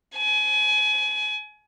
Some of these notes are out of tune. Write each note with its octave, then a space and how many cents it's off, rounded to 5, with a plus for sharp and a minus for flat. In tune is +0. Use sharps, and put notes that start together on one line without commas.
G#5 +30